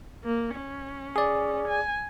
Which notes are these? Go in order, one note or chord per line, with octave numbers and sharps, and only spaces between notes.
A#3
C#4
G#4 D5
G#5